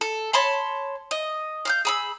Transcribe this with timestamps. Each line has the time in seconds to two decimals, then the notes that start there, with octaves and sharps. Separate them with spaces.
0.01 A4
0.33 C#5 A5 B5 C6
1.11 D#5
1.65 F5 F6 G6
1.85 G#4 B5 E6